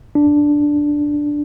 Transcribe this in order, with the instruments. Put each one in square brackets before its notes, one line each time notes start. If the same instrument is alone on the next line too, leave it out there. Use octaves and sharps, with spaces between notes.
[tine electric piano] D4